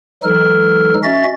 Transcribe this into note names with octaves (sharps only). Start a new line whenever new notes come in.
E3 F#3 G#3 D#4 A4 F6
C#4 F#4 D#5 E5 A6